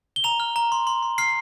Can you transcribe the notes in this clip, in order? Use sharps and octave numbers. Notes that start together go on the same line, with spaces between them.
G7
A#5 F7
F6
A#5
C6
C6
C6
F6 C7